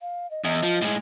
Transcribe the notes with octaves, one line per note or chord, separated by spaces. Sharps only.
F5
D#5
E2 D#5
F3
A2 G#3